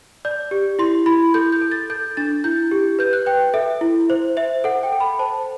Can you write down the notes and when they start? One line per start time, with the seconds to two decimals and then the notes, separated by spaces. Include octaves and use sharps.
0.25 D5 G6
0.51 G4
0.79 E4 C6
1.06 E4 B5
1.34 A4 G6
1.52 G6
1.62 A4
1.71 A6
1.90 A4 G6
2.17 D4 A6
2.44 E4 G6
2.71 G4
2.99 B4 G6
3.13 F#6
3.26 B4 G5
3.54 A4 E5
3.81 E4
4.10 C5
4.37 C5 E5
4.64 A4 F#5
4.83 G5
4.92 A4
5.00 B5
5.19 C5 A5